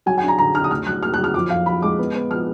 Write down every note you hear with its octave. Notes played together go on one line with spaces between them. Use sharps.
F#3 G#5
G#5
D4 A#5
D3 A#5
D4 F6
D#6
D2 F6
F#3 F#6
A#3 F6
F#6
F#3
F6
F2 D6
F2 F5
F3 B5
G#3 D6
B3
B3
F3 F6